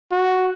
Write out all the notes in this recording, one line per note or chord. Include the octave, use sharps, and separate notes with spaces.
F#4